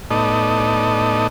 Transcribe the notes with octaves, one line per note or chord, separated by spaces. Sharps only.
A2 B3 D#4 A4 D5 D#5